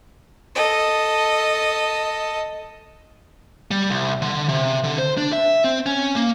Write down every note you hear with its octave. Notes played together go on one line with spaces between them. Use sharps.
A4 D#5
G3
C2
D3
C3
D3
C5
D4
E5
C4
C#4
A#3